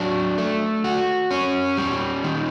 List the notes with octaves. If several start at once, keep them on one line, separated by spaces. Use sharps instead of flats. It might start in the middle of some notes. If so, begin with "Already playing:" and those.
Already playing: F#3 D4
A3
F#4
C#4
G3
D#3